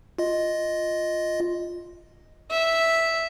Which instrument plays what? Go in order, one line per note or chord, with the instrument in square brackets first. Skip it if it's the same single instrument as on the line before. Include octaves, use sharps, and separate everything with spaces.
[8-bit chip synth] F4 D#5
[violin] E5